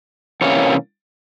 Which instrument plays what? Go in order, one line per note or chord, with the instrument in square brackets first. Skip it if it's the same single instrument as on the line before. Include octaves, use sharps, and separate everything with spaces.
[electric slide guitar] C3 E3 G3 A#3 C#4 C#5